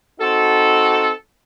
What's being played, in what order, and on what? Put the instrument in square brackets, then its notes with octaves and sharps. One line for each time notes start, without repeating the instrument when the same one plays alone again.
[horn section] C4 D#4 F#4 A4